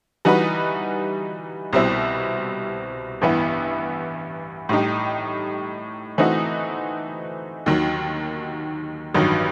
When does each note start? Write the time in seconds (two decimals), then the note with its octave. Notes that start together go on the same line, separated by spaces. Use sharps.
0.25 E3 G3 D#4 F#4 B4
1.73 C2 B2 G3 C4 E4
3.21 A1 G2 E3 B3 E4
4.69 A2 G3 D#4 G4
6.18 E3 A3 C4 D#4 F#4
7.66 D#2 D#3 F#3
9.14 A1 G2 D#3 F#3